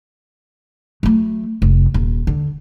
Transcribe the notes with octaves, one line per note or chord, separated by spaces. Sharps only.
F#3 A3
F1
D#1
D3